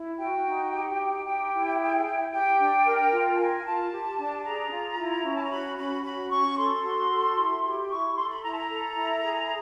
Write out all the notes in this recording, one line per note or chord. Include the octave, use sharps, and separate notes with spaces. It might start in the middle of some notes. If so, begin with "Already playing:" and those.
Already playing: E4
F#4 G5
D#4
G4
D#4
G4 G5
E4
G#4
E4
G4 G5
D4
A#4
F4
A5
A#4 G#5
F4 A5
G4
D4
G#4 A#5
F4
E4
C#4
A5
A#5
F#4 B5
C#4 B5
F#4 B5
C#4 C#6
A4 C6
F#4
A4
E4
G4
E4 C#6
A4 C6
B5
E4 A#5
A5
A#5
A4
E4
G#4